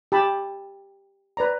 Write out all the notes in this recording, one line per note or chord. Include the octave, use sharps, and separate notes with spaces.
G4 A5 B5
B4 D5 A#5